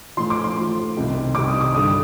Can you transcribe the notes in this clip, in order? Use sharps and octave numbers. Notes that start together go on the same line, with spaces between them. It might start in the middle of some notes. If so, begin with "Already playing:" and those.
A2 F3 C6
D6
C6
A2 F3
C2 C3 D#3 G3
C2 C3 D#3 G3 D6
D#6
D6
G2 D3 G3 D#6